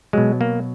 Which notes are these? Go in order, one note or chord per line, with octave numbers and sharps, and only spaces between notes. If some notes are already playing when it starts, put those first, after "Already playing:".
B2 F#3 G#3
A#3